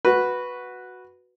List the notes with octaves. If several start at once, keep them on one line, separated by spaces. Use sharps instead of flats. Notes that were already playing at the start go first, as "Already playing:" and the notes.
F#4 B4